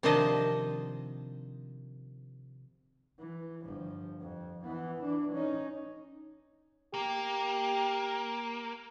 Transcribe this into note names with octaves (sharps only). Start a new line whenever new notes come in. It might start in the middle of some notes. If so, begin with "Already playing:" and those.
C3 D#3 F3 D4 C5 D#5
E3
G1 F3
F2
E3 B3
E3 D4
C#4 D#4
A#3 G4